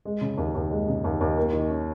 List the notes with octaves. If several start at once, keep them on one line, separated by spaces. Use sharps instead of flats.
G#3
C#3
D#2
D#2
G#3
C#3
D#2
D#2
A#3
D#3
C#4